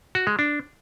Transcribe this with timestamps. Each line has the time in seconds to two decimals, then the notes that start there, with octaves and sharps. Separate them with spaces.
0.15 F#4
0.27 G#3
0.39 D4